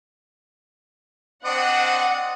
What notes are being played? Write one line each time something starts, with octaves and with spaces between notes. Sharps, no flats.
C4 D4 D#5 F#5